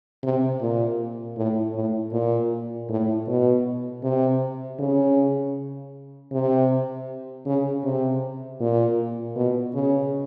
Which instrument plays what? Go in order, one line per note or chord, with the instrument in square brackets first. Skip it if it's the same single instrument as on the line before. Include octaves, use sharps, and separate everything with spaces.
[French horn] C3
A#2
A2
A2
A#2
A2
B2
C3
C#3
C3
C#3
C3
A#2
B2
C#3